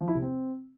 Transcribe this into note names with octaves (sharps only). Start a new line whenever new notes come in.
F3
E4
C3
C4